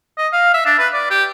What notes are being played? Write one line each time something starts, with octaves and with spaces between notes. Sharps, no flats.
D#5
F5
E5
D4
B4
D5
G4